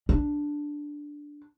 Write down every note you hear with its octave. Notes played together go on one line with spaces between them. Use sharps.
D4